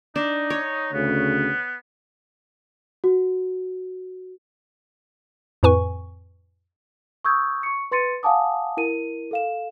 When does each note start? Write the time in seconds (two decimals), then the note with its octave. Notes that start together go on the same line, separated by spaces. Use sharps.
0.16 D4 D#4
0.50 C#5
0.93 D2 C#3 B3
3.04 F#4
5.63 F2 A2 B4 G#5 C#6
7.25 C#6 D#6 E6 G6 G#6
7.63 C#6 C#7
7.92 B4 C6 A6 C#7 D#7
8.23 F5 F#5 G#5 A5 D6 D#6
8.77 E4 A#4 D#7
9.31 A4 F5 E7